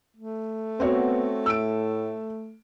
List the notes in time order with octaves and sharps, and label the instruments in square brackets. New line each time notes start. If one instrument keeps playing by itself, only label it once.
[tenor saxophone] A3
[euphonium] B3 [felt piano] C4 F#4 C#5
[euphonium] A2 [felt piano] E6 D7